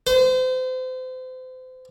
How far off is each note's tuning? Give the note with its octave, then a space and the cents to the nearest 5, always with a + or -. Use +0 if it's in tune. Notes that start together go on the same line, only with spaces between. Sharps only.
C5 -35